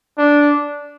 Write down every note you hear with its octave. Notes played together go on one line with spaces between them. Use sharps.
D4